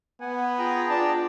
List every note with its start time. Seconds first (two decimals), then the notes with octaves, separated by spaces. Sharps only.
0.20 B3 F#5 G#5
0.59 F4 G#4 G5 A#5
0.90 D4 A5